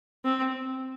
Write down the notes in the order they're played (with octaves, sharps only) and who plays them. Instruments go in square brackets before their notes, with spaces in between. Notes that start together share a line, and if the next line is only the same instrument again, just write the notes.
[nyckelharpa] C4